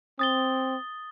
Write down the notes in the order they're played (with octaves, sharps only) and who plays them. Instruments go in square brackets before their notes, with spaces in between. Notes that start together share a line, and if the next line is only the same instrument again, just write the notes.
[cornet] C4 [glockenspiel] D#6 A6 G7